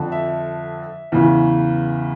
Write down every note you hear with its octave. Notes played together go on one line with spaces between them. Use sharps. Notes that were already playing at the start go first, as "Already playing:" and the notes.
Already playing: F2 D3
E5
E2 C#3 E3